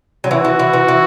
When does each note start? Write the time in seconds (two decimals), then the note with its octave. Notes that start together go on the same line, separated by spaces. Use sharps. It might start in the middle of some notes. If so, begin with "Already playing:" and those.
0.24 F#3
0.30 E3 F#4
0.45 E3
0.59 E3
0.73 E3
0.88 E3